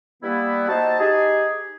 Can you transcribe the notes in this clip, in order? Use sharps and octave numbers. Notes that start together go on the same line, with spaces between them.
G3 A#3 B3 E4
D#4 F#4 C5 D#5 A5
D#4 G4 G#4